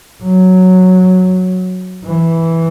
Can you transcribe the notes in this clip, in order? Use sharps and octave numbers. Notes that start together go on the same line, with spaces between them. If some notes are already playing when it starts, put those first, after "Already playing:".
F#3
E3